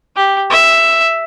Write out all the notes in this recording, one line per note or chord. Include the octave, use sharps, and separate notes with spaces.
G4
E5